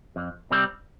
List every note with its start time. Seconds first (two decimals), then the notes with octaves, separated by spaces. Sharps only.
0.16 F2
0.51 C3 G3 C4